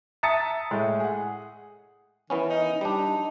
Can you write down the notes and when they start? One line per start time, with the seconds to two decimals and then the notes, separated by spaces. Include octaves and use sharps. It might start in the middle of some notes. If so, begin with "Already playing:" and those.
0.23 E5 A5 A#5 D#6 A6 C#7
0.71 A2 G#3
1.00 G#4 F#5
2.30 D#3 E3 B3 C#4
2.50 D#4
2.81 G3 D4 D#4